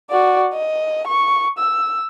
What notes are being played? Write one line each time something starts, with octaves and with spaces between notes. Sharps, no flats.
F#4 D5
D#5
C#6
E6